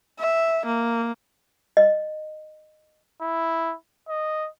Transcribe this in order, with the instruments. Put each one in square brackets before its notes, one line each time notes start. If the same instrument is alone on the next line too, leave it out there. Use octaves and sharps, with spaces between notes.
[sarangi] E5
A#3
[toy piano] D#5
[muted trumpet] E4
D#5